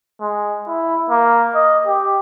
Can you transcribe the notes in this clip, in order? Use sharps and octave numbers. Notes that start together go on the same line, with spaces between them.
G#3
E4
A#3
D#5
G4